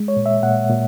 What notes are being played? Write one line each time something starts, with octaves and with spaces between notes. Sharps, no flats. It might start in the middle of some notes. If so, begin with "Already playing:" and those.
Already playing: G#3
C#5
A#2
E5
A#2 F#5
A#2